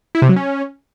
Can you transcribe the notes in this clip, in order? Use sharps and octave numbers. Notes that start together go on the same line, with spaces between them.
E4
C3
F#3
C#4